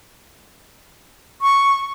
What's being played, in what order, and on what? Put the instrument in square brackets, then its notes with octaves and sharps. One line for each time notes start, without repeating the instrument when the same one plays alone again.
[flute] C#6